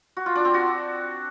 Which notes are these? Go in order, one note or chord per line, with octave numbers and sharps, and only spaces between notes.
F#4
F4
D4
C4
F#4